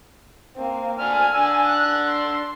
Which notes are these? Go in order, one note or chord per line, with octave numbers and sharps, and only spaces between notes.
A#3 C4
D3 D4 G#5 F6
D4 E6
F#6
C6